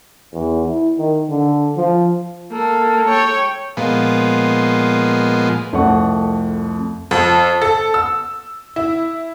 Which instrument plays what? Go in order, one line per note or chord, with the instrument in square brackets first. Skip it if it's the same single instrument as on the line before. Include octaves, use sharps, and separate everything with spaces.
[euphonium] E2
E4
D#3
D3
F3
[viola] A#3 [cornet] A4
[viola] C#5 G5
[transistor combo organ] A#2 F3 G#3 B3
[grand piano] C2 F2 A3 D5 F#5 C#6
[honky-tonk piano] F2
A4
E6
E4